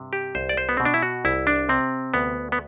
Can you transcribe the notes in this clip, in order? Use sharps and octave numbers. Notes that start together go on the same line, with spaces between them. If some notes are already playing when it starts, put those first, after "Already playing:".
Already playing: G2 C3
G4
C2 C5
D5
C5
B3
B2 C4
D4
E4
F#4
C2 E4
D4
C3 C4
D2 B3
B3